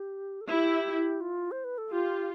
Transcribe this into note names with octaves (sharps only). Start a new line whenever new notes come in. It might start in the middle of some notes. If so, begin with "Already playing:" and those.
Already playing: G4
A4
E4 G4
F4
C5
B4
A4
F4 G4